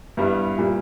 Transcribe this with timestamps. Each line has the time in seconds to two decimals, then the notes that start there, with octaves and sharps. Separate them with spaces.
0.17 G2 G3 B3 E4
0.58 A#2 G3